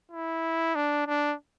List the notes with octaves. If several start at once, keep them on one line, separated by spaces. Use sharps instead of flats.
E4
D4
D4